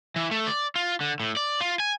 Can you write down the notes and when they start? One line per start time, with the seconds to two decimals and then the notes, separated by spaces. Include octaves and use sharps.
0.16 E3
0.31 A3
0.47 D5
0.75 F4
1.01 D3
1.20 A2
1.37 D5
1.61 F4
1.80 G#5